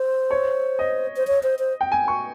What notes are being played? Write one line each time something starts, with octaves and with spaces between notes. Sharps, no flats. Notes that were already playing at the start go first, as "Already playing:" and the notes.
Already playing: C5
C#5
D#5
C5
C#5
C5
C5
G5
G#5
C#6